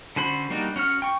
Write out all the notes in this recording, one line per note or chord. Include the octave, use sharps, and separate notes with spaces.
D3 C#4 F#4 C5 B5
G3 A#3 D4 D#4 F#4
C#4 F#4 C#5 F6
G5 C#6